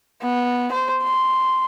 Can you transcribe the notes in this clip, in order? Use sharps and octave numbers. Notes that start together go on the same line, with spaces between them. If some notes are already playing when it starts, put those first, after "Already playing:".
B3
C5
C6